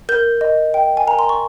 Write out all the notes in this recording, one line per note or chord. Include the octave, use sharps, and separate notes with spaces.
A#4 G6
D#5
G5
G#5
A#4 A#5
C6
C#6